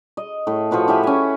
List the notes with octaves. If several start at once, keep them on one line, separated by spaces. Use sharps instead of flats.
D#5
A2
F3 F#4 B4 C#6
E4 G4 E5 G#5
C#4 G#5